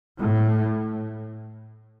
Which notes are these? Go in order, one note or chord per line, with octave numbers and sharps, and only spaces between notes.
A2